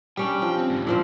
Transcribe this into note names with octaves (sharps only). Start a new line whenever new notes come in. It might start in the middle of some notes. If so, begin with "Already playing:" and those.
G3 C#4 D4 G5
F3
C4
E2 G#2
A#2 F3 C4